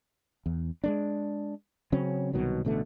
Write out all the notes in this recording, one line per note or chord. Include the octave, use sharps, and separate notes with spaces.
E2
G#3 A3 D4
C#3 F#3 C4 C#4
C2 B2 D#3 F#3
A1 B2 D3 A3